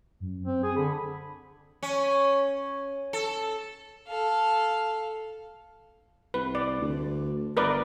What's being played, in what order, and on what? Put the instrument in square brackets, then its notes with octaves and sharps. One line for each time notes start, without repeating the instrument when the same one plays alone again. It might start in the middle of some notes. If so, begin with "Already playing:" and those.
[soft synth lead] F#2
[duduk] C4
[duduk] G#4 [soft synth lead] D#6
[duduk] D3 [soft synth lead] B5
[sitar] C#4
A4
[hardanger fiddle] A4 F5
[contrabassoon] C2 [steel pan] B4
[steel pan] D5
[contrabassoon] D2
[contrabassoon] G1 [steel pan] A#4 B4 D5